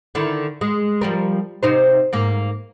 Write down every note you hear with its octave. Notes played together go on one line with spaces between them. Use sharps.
D3 D#3 E4
G#3
F3 G3 A#4
C3 D#4 C5
G#2 A#3